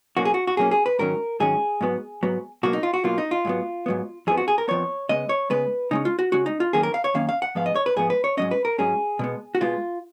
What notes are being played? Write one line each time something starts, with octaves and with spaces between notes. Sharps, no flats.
B2 F#3 A#3 C#4 F#4
G#4
F#4
F#4
B2 F#3 A#3 C#4 G#4
G#4
B4
G#2 D#3 F#3 C#4 A#4
G#2 D#3 F#3 C#4 G#4
G#2 F#3 B3
G#2 F#3 B3
B2 F#3 A#3 F#4
D#4
F4
F#4
B2 F#3 A#3 F4
D#4
F4
G#2 F#3 B3
G#2 F#3 B3
F2 F3 B3 G#4
F#4
G#4
A#4
F2 F3 B3 C#5
C#3 G#3 B3 D#5
C#5
C#3 G#3 B3 B4
C#3 G#3 C#4 D#4
F4
F#4
C#3 G#3 C#4 F#4
D#4
F4
F#2 D#3 A#3 C#4 G#4
A#4
F5
C#5
F#2 D#3 A#3 C#4 F5
F5
F#5
G#2 F3 B3 F5
D#5
C#5
B4
G#2 F3 B3 G#4
B4
C#5
G#2 F#3 C#4 D#5
B4
A#4
G#2 F#3 C#4 G#4
B2 G#3 B3
F#4
B2 G#3 B3 F4